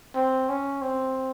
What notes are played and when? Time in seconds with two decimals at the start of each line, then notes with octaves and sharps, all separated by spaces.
0.15 C4
0.49 C#4
0.81 C4